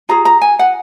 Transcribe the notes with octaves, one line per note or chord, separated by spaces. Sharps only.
F4 G#4 A#5
A#5
G#5
F#5